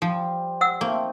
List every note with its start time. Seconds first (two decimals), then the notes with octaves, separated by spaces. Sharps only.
0.02 F3 G3 C5
0.61 F#5 E6
0.81 A3 A#3 C4 D#4